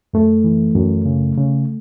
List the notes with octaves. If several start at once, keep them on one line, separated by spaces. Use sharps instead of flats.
F#2 A3
E3
F#2
C#3
C#3